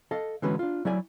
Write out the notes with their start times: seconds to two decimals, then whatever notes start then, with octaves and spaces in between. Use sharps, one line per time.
0.11 A4 D#5 F5 A5
0.42 D3 E3 G#3 C#4 F#4 B4
0.59 D4 F4
0.85 F#3 E4 D5 G#5